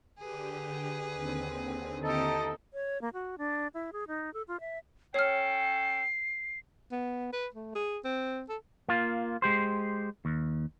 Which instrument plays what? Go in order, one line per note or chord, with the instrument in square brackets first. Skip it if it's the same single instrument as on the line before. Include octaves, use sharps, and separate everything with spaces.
[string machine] D3 G4 [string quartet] G#4 B4
[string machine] D#2 D3 C4
[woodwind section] D#4 A4 [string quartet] E4 G4
[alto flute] C#5
A#3
F#4
D4
E4
G#4
D#4
A4
F4
E5
[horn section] C#4 A4 G5 [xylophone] C#5 F6 [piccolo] C7
[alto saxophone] B3
B4
A3
G#4
C4
A4
[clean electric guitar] A#3 F4
G#3 G4 C5
D#2